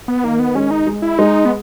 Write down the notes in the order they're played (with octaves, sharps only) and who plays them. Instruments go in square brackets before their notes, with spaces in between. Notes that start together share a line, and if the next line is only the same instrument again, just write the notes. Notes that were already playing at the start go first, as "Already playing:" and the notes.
[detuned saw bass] B3
[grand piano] D#3 [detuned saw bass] A#3
[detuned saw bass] B3
[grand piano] G#3 [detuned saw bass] C#4
[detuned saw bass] D#4
[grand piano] G#3
[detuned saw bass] E4
[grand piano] G#3 [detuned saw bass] D#4
[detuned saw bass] B3